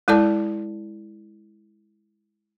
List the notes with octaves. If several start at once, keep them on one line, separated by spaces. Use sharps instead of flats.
G#3 E4 A4 D5 A5